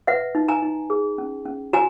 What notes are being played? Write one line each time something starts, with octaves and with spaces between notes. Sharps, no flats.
B4 E5 F#5
D#4
G#5 A#5
D#4
G#4
C#4
C#4
F#4 G#5 A#5